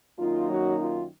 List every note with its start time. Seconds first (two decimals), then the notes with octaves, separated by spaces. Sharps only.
0.19 F#2 D#3 A#3 D#4 F4
0.49 F#3 F#4
0.78 F4